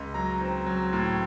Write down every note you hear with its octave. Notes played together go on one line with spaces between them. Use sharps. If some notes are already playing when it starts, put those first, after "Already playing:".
Already playing: C#2
F#3 A#5
C4
F#3
A2